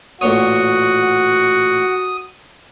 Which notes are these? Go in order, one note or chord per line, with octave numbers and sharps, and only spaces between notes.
A1 A#2 F#4 C#5 D#6